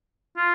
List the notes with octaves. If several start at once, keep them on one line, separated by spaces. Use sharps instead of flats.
F4